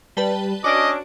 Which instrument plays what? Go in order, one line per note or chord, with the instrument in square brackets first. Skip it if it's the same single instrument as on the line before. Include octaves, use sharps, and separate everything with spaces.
[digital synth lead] G3 [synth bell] B4 A5 G7
[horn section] C#4 D4 [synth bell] F#4 D7 [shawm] D#5 [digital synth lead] D6